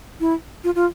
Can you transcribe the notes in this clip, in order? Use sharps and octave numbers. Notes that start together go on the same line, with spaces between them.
E4
F4
F4